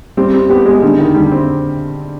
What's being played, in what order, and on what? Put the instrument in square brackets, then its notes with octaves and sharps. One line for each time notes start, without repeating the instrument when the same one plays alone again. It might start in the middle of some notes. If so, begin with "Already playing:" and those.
[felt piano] G3 [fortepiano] C4
[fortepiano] C4
[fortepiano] B3 [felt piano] G4
[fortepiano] G#3
[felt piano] D3 [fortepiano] G3
[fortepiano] D#3
[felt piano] D3 [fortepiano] G3
[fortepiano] C4